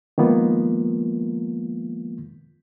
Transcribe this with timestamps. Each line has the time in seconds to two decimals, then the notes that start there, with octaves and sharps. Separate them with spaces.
0.18 D#3 F3 G#3 A#3 B3 F4